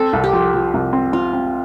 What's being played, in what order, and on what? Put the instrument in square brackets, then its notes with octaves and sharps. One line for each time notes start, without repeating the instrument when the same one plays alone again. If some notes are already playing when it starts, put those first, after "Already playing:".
Already playing: [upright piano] C4 [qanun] A4
[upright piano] C2
[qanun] G4
[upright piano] F3
F3
C2
C4
[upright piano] C4 [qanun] F4
[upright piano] C4